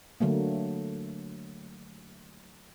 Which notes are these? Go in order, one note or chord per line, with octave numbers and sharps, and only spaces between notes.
D3 F#3 A3 A#3